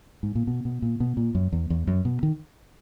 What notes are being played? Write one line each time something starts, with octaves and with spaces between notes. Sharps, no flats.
G#2
A#2
B2
B2
A#2
B2
A#2
F#2
E2
E2
F#2
B2
D#3